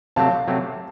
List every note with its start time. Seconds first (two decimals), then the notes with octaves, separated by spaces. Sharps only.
0.16 C3 F#3 A3 C4 F5 A5
0.48 C3 F#3 A3 C4